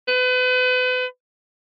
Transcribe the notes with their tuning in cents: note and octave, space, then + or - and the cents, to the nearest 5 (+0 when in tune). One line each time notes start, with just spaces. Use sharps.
B4 +35